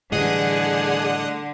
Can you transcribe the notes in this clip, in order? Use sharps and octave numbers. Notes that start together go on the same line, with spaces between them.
A2 D3 E3 G3 G#4 D#5 F#5 D#6